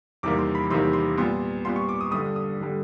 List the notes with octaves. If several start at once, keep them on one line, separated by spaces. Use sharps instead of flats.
E2 C3 D#3 G3 A#3 D6
C6
B5
E2 C3 D#3 G3 A#3 C6
C6
A#2 G3 B3 C6
A#2 G3 B3 C6
C#6
D6
D#6
G2 D3 G3 D#6
D#6
D3 G3